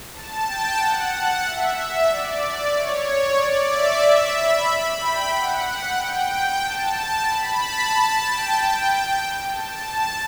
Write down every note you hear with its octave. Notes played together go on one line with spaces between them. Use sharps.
A5
G5
F#5
E5
D5
D5
C#5
D5
E5
B5
B5
G5
F#5
G5
A5
B5
A5
G5
A5